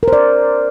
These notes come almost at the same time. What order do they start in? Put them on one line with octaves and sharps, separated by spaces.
A#4 C5 D5